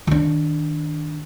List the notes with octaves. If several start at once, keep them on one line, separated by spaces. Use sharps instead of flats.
D#3 D4